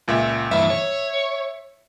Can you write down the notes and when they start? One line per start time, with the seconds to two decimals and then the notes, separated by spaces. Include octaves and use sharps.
0.08 C#2 A#2 E5
0.51 G2 E3 E5
0.70 C#5